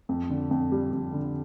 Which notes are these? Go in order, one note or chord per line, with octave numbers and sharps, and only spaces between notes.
F2
D3
F2
G3
F2
D3